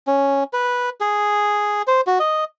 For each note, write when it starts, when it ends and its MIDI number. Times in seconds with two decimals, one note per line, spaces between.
0.07 0.44 61
0.53 0.90 71
1.01 1.82 68
1.87 2.01 72
2.07 2.19 66
2.20 2.44 75